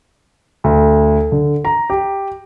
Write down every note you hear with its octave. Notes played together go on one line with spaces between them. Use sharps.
D2
D3
A#5
G4